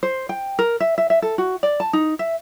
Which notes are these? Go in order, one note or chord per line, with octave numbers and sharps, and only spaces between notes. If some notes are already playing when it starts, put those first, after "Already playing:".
C5
G5
A#4
E5
E5
E5
A4
F#4
D5
A5
D#4
E5